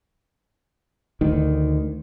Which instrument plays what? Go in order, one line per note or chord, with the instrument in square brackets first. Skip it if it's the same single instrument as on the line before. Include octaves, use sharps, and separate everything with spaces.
[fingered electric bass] D2 D#3